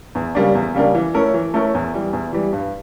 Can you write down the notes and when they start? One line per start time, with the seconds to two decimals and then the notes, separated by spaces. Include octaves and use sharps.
0.15 E2
0.35 C#3 G3 A#3 D4
0.55 E2
0.74 C#3 G3 A#3 D4
0.95 E3
1.14 A3 C#4 E4 A#4
1.34 E3
1.54 A3 C#4 E4 A#4
1.74 E2
1.94 E3 G3
2.13 E2
2.33 E3 G3
2.53 G2